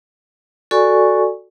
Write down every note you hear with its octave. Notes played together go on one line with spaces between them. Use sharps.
F#4 A4 D5 G#5 C#6